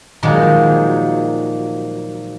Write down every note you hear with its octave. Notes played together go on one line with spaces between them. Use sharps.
A#2 D#3 F3 F#3 G#3